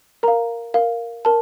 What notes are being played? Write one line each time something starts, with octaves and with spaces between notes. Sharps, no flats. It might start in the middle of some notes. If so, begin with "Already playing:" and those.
A#4 F5 A#5
A#4 F5
A#4 A5